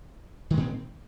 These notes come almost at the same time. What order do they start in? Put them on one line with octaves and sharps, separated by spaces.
D#3 G#3 A#2 C4